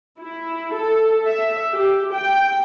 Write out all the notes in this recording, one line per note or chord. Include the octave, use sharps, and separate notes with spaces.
E4
A4
E5
G4
G5